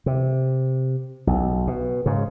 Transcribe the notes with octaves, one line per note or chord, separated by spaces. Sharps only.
C3
B1
B2
G#2 C#3